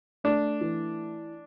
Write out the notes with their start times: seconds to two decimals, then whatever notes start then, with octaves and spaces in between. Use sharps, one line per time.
0.24 A3 D4
0.61 E3